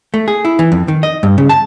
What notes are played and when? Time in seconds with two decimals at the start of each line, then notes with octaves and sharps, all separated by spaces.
0.14 A3
0.28 G#4
0.45 E4
0.59 E3
0.72 F2
0.88 D#3
1.03 D#5
1.23 G2
1.38 C#3
1.49 A5